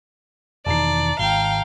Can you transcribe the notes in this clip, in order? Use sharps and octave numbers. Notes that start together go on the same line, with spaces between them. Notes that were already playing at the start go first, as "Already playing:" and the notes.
E1 E2 D#3 D5 A5 A#5 C7
G#1 F5 G5 A#5 G7